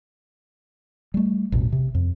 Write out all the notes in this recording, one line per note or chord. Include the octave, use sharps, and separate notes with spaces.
G3 A3
A1 E2 B2
C3
F2